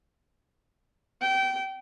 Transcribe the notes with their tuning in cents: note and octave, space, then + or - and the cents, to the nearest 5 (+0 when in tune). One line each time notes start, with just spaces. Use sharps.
G5 -25